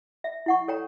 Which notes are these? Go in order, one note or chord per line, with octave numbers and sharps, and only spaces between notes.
E5
E4 F#5 C#6
A4 C#5 G5 A#5